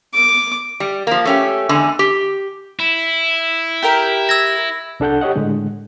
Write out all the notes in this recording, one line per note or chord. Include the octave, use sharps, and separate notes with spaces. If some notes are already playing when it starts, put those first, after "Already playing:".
D6
G3
F3 A#3
A3 C#4 G4
E2 D3 G#3 G#5
G4
E4
G4 A#4 G5
E6 G#6 A#6
C2 D4 A4 F#5 G6
G4 C#5 D#5 F#5
A2 D3 G#3